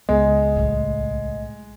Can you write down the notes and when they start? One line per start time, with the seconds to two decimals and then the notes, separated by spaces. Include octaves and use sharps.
0.09 C#2 E3 G#3 B3 D#4 D#5
0.56 B1 A2